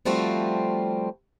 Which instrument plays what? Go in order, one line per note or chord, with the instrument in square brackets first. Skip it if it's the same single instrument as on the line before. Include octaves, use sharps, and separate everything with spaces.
[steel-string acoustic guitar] F3 G3 A3 C4 F4 F#4